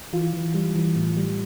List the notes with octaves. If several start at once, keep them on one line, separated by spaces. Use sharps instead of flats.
E3 F4
E3
G3
E3
A2
G3